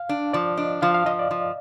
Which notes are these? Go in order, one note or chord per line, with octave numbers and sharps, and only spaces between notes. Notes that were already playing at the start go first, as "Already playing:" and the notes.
Already playing: F5
D4
F3 D5
D4 D#5
F3 F5
F5
F3 D#5
D5
F3